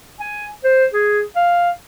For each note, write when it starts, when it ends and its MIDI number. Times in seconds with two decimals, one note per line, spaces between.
0.20 0.48 80
0.64 0.86 72
0.94 1.22 68
1.36 1.70 77